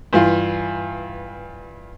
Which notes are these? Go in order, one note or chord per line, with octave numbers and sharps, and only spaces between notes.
G2 E3 F4